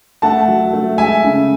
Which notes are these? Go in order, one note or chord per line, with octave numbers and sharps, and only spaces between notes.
A3 F#5 A5
F#3
A3
G#3 E5 G#5
C#3